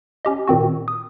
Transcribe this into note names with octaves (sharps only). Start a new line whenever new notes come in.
C#4 G4 D#5
A#2 D#3 C4 F#4
D#6